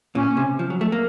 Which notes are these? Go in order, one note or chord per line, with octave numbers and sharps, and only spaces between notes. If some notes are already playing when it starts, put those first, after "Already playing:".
A#2 C#4
C3
F3
F#3
A3
A#3